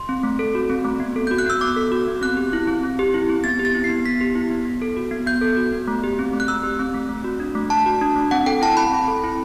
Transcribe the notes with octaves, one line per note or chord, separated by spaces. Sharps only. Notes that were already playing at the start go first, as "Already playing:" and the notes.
Already playing: C6
C4
A3
A4
F#4
C4
A3
B3
A4
F#4 G6
F#6
B3 E6
B3 D6
A4
F#4
B3
C4 F#6
G4
E4
C4
C4
G4
E4
C4
B3 A6
G4
A6
E4
C7
B3
B3 B6
G4
E4
B3
B3
A4
F#4
B3
B3 G6
A4
F#4
B3
A3
G4
C4
A3
F#6
A3 E6
G4
C4
A3
A3
F#4
D4
A3
A3 A5
F#4
D4
A3
C4 F#5
A4 G5
E4 A5
C4 B5
C4
A4
E4